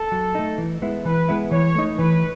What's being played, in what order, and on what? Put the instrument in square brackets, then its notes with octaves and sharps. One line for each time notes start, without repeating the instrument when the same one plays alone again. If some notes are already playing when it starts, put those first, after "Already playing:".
Already playing: [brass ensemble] A4
[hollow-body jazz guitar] F#3
A3 D#4
E3
G#3 B3 E4
[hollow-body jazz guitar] E3 [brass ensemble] B4
[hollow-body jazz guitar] G#3 B3 E4
[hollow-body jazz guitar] E3 [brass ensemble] C#5
[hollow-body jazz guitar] A3 D#4
[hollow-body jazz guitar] E3 [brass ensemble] B4